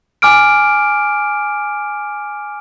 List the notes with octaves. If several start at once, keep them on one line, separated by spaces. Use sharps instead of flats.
G#5 D6 F6 D7